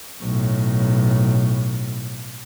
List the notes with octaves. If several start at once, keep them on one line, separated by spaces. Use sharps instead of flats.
B1 A2